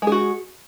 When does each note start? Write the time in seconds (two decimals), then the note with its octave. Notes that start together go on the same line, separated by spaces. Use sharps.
0.02 G#3
0.07 G#4
0.12 F#4